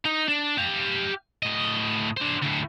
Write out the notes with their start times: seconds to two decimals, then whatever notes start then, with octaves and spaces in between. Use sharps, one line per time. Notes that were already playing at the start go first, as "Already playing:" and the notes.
0.05 D#4
0.28 D4
0.58 G4 F5
1.43 A2 D#5
2.17 D4 C5
2.43 D2 A2